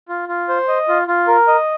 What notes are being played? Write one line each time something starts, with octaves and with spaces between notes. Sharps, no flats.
F4
F4
C5
D#5
F4
F4
A#4
D#5